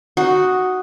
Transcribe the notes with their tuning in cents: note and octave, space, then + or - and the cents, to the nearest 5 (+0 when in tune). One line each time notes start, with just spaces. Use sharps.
D#4 +0 F#4 +0